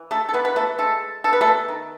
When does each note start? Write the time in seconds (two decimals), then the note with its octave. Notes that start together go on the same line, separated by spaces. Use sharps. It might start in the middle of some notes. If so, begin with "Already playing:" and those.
Already playing: E3
0.11 A3 A4
0.29 A4
0.34 E3 B3 B4
0.45 B4
0.56 A3 A4
0.78 G#3 A3 A4
1.24 B3 A4
1.33 B4
1.41 A3 A4
1.68 D#3